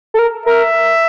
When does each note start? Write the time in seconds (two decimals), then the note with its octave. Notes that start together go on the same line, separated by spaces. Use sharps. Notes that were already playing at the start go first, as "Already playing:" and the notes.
0.14 A4
0.19 A#4
0.46 A#4 E5